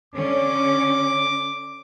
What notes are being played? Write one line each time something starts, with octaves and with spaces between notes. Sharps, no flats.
D3 C#4 D6